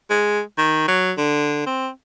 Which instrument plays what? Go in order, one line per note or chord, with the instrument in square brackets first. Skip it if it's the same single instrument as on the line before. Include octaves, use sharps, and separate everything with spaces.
[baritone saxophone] G#3
D#3
F#3
D3
C4